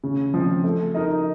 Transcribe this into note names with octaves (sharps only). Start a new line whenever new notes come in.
C#3
F3 C4
A3
D#4 A#4 D#5